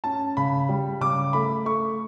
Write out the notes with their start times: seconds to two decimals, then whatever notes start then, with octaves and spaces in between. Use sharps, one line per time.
0.04 C#4 A5
0.37 C#3 B5
0.69 G3
1.01 C#3 D6
1.33 A3 B5
1.66 A3 C#6